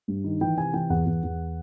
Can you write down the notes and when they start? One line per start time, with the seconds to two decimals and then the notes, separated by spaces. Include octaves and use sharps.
0.08 G2
0.24 D#3
0.41 E3 G5
0.57 C3 G#5
0.74 E3 G5
0.90 E2 F#5
1.06 E2
1.24 E2